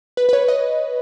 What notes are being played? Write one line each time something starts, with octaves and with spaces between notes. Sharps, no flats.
B4
B4
C#5
D#5